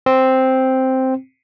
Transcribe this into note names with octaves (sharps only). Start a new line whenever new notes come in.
C4